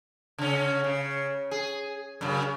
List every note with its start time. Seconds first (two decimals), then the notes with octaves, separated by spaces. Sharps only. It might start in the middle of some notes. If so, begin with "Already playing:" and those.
0.38 C#3 C#4
0.84 C#3
1.51 G#4
2.21 F#2 C#3